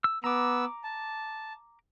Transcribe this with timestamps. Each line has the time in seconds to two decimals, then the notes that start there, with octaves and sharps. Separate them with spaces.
0.04 E6
0.24 B3 A#5 D6 E6
0.84 A5